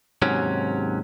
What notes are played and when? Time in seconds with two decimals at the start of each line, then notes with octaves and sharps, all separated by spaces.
0.22 D#2 G#2 C3 F#3 C#4